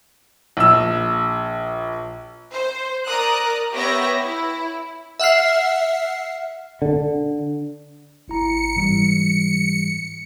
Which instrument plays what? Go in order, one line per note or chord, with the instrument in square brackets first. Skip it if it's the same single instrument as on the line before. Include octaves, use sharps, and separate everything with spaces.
[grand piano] A#1 E6
[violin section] C5
A#4 D5 A#5 D#6 F#6
B3 G4 B4 C#5 E5 A#6
E4
[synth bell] E5 F#5 F6 C7
[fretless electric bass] D3
[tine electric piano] G#1 E4 A#5 [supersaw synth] C#7
[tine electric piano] G#2 E3 G3